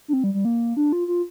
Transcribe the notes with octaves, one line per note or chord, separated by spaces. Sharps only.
D4
C4
G3
G3
A#3
D4
F4
F4